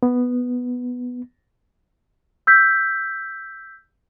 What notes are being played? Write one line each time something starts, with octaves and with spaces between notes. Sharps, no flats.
B3
E6 G6 B6